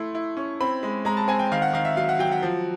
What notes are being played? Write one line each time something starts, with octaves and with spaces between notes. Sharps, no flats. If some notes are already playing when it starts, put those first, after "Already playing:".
Already playing: A3 E4 C6
E4
C#4
C4 B5
G#3
G#3 A#5
A5
C4 G#5
G5
D#3 F5
F#5
D#3 F5
E5
F#3 F5
F#5
F#3 G5
F#5
F3